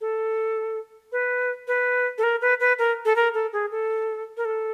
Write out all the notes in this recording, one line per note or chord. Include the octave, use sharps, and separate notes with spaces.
A4
B4
B4
A4
A#4
B4
B4
A#4
A4
A#4
A4
G#4
A4
A#4
A4